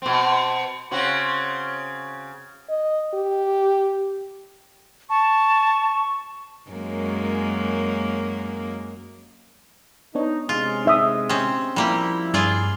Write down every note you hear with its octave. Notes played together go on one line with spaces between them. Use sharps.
B2 C4
C#3 C4 F#4
D#5
G4
A5 C#6
F#2 G#3 A#3
B3 D4 D#4 C#5
C3 G#3 F4
D#4 E5 D#6
C4 C#4
F3 G3 A#3 E4 G4
G2 F4 G#4 D5